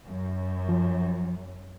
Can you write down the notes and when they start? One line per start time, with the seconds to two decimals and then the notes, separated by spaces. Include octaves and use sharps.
0.10 F#2
0.69 F3